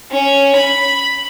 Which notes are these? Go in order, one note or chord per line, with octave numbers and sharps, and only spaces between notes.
C#4
B5